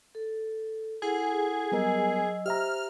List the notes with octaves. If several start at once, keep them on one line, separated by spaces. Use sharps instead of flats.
A4
E4 G#4 A4 F#5
F#3 G3 B3 A#4 D#5 E6
G4 C5 E5 A#5 F6